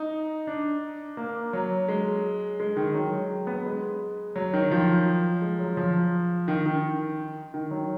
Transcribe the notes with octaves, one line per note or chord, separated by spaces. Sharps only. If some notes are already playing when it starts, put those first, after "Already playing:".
Already playing: D#4
D4
A#3
F#3
G#3
G#3
D#3
F#3
G#3
B3
G#3
F#3
D#3
F3
G#3
F#3
F3
D#3
D#3
D#3
F#3